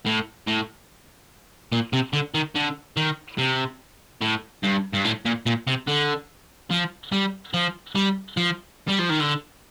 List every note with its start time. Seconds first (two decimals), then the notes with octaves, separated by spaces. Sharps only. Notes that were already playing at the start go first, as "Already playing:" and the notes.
0.06 A2
0.47 A2
1.72 A#2
1.93 C3
2.13 D3
2.35 D#3
2.56 D3
2.97 D#3
3.38 C3
4.21 A2
4.63 G2
4.93 G2
5.04 A2
5.25 A#2
5.46 A#2
5.67 C3
5.87 D3
6.71 F3
7.12 G3
7.54 F3
7.95 G3
8.37 F3
8.88 G3
8.99 F3
9.09 D#3
9.20 D3